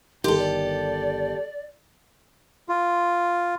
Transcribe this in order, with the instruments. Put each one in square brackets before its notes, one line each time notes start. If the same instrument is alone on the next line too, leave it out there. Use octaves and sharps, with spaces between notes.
[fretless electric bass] G1 D#3 [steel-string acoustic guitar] G4 A4 [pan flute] C6
[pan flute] D5
[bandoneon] F4